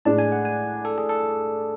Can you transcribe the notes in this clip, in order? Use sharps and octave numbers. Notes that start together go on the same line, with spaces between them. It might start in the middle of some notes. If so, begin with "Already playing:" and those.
A2 G#3 D4 A5
G#5
F#5
G#5
A4
G#4
A4